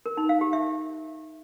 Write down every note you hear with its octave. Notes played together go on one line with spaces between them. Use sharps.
A#4
D#4
F5
G4
E5